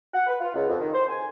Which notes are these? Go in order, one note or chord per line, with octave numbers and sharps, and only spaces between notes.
F#5
B4
F4
C#2
F2
D#3
C5
G#5